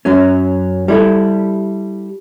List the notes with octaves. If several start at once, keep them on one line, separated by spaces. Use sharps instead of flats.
F#2 F#3 C#4
G3 E4 A4